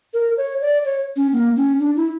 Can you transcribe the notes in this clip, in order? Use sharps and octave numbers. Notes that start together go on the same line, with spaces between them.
A#4
C#5
D5
C#5
C#4
A#3
C#4
D4
E4